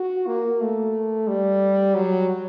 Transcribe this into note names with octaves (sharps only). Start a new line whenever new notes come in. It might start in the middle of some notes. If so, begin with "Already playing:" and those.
Already playing: F#4
A#3
A3
G3
F#3